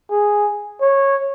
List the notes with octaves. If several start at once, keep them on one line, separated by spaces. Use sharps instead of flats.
G#4
C#5